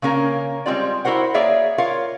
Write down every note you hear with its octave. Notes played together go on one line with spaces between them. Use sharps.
C#3 A#3 C#4 A#4
G3 G#3 C4 F4 D5
E4 F#4 A#4 C5 F#5
A#3 G#4 C#5 D5 E5 F5
F4 A#4 C#5 F5